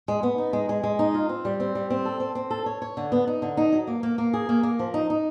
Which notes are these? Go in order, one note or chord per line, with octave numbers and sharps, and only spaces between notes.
G#3
B3
D#4
G#3
G#3
G#3
D#4
F4
C4
G3
C4
G3
C4
A4
C4
C4
A4
C#5
C#5
D3
B3
D#4
D3
D#4
F#3
A#3
A#3
A#3
G#4
A#3
A#3
F3
D#4
D#4